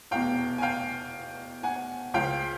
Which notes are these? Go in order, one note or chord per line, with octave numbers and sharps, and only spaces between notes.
F1 E2 B2 F5 G5
G#5
F5 G5
F#5 G#5
C#2 C#3 F3 F5 G5